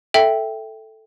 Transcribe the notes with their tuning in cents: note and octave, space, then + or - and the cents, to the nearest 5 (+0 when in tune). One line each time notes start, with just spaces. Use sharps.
A4 +0 E5 +0 G5 +0